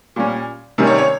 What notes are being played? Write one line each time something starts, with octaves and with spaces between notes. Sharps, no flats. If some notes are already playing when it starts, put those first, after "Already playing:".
A#2 G3 C#4
C3 D#3 G3 C#4
C#5
C#5